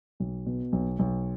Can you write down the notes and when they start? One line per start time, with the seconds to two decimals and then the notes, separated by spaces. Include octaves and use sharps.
0.20 B1
0.46 B2
0.72 B1
0.99 B1